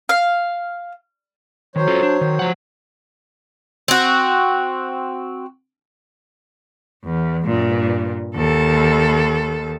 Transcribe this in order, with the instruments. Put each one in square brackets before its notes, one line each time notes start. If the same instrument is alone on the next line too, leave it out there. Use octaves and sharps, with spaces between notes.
[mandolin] F5
[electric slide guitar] D#3 [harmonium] F#3 C5 C#5
[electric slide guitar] C#4 F4 A4
D4
D#3
F3 F#5
[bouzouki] C4 F#4
[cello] E2
G2 A#2
D#2 A4